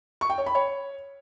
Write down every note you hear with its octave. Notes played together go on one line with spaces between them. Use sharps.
C#6
G5
C#5
B5
C#5